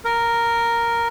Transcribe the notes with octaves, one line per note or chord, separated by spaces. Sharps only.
A#4